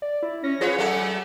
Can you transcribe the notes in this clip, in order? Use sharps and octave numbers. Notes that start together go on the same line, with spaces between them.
D5
E4
C#4 A#6
F3 F4 G#4 B4 C#5
F#3 A3 A4 F#5